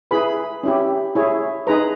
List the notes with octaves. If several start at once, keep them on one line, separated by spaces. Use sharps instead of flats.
E4 G#4 B4 B5
C#4 E4 G4
E4 G#4 C#5
D#4 G#4 B4 A#5